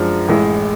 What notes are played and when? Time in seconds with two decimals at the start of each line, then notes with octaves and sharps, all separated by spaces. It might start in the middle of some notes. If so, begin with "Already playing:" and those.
Already playing: F#2 F3 G#3 D4
0.28 A1 A2 G#3